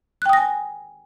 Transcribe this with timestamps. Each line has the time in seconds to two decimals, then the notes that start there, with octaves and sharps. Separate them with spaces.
0.22 F#6
0.26 G5
0.29 D#6
0.33 A#6
0.37 G#5